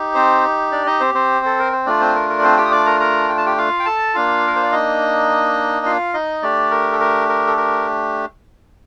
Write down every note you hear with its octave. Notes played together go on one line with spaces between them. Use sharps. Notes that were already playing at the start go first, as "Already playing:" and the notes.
Already playing: D#4 G4
C4 C5
D4 D5
D#4 D#5
C4 C5
C4 C5
A4
A#4
C5
A3 D4 F4 D5
C4 C5
A#4
A#4
D5
C4 C5
G4 G5
D#6
D5 D6
A#4 A#5
A#4 A#5
G5
A5
G4 G5
F4 F5
G5
A4 A5
A#3 D4 F4 F5
A#4
C5
D5
D#4 D#5
F4 F5
D#4 D#5
A3 D4 G4 D5
A#4
A4
A#4
A#4
A4
A#4